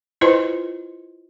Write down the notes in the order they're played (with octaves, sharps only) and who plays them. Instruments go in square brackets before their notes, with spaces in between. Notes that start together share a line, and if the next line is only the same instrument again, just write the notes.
[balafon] E4 F4 B4 C5 D#5 C6